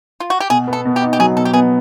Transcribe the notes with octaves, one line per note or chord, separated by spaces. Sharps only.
F4
F#4
G4
B2 G#4
B3
A4
B2
G4
D#4
G4
F#3 G#4
B2 A4
G4
B3 G#4